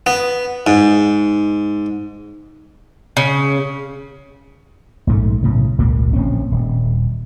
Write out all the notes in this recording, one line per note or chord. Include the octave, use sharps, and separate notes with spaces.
B3
G#2
C#3
A#1 G#2 E3 A3
B1 A2 C#3
G#1 C#2 A#2 A#3
D1 A#1 C4 C#4
D#1